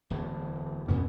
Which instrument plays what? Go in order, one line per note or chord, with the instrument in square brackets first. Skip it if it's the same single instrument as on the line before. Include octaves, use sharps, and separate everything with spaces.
[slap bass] D1 E2 A2
[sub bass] F2 [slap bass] A2 B3 C#4